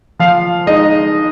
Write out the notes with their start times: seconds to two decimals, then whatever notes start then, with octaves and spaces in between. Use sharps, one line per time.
0.19 F3 F5
0.66 G#3 D#4 D#5